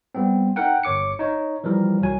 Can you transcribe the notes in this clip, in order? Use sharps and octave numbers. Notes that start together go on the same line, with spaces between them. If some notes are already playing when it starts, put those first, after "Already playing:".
G3 B3 C4
D#4 A#4 F#5 G5
G1 C#5 D6 C#7
D#4 C#5
E3 F3 G3 A#4
C2 F#3 G#5